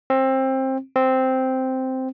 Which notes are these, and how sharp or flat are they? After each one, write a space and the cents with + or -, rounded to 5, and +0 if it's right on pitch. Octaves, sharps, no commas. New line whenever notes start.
C4 +20
C4 -5